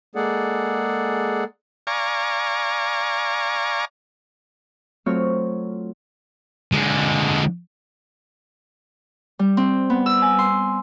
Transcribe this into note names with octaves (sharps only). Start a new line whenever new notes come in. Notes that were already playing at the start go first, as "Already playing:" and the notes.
G#3 A#3 G#4 A4 D5 F#5
D5 F5 G#5 A#5 C#6
F#3 A3 C4 F4 C#5 F6
D3 G#3
G3
C4
B3
E6
G#5
C6